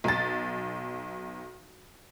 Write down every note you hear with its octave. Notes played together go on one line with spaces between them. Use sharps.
B1 A6